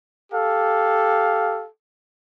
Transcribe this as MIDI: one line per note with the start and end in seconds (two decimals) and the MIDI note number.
0.33 1.66 67
0.33 1.66 69
0.33 1.66 77